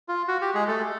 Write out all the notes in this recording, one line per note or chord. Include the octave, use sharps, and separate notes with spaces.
F4
F#4
G4
G#3 G#4
A3 A4